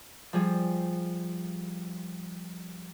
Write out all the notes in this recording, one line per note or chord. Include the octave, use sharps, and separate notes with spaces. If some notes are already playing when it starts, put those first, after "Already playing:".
F3 G3 G#4